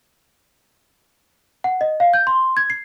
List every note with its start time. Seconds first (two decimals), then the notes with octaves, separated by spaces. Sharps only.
1.64 F#5
1.81 D#5
2.00 F5
2.14 G6
2.27 C6
2.57 G#6
2.70 C7